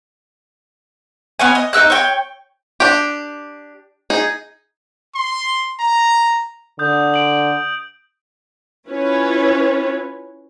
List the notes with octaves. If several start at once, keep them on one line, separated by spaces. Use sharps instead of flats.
B3 C#4 C#5 G#5
D#5
D#4 A#4 E6 F#6
C#5 G5
D4 G4
D#4 G#4
C6
A#5
D3 D#6 G6
D7 F#7
C#4 E4 F4 B4 C#5